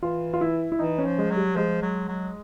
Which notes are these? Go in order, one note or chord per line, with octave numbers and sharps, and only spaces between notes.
E3 F4
F4
E4
E4
E3 D#4
C#4
F3
G#3
F#3
G3
F3 G#3
F#3
F#3